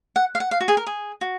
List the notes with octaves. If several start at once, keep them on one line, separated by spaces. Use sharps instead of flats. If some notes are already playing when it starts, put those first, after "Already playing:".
F#5
F5
F#5
F5
F#4
G#4
A#4
G#4
F#4